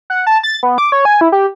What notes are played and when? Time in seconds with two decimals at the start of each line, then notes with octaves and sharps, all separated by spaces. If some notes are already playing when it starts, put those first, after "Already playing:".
0.10 F#5
0.27 A5
0.43 A6
0.63 B3
0.78 D6
0.92 C#5
1.05 G#5
1.21 E4
1.32 G4